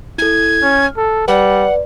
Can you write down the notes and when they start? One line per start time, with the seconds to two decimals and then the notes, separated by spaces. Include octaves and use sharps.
0.18 E4 A4 G#6
0.63 C#4 F6
0.97 A4
1.28 G3 B4 D5 F#5